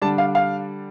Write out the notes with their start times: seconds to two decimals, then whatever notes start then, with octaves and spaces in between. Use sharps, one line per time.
0.02 D3 G3 D4 A5
0.18 F5
0.35 F5